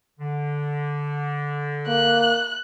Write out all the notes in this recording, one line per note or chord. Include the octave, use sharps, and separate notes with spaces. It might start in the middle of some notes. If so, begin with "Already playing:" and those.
D3
A#3 F#6